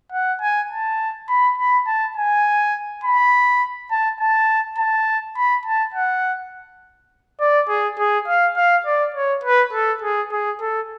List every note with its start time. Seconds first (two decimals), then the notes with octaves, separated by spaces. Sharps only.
0.13 F#5
0.42 G#5
0.71 A5
1.29 B5
1.58 B5
1.87 A5
2.17 G#5
3.04 B5
3.91 A5
4.20 A5
4.78 A5
5.37 B5
5.66 A5
5.94 F#5
7.40 D5
7.69 G#4
7.99 G#4
8.28 F5
8.57 F5
8.86 D5
9.15 C#5
9.44 B4
9.73 A4
10.02 G#4
10.31 G#4
10.61 A4